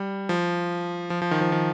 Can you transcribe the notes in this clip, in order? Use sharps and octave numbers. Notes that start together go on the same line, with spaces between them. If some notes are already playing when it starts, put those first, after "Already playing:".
Already playing: G3
F3
F3
F3
D#3
F3
D#3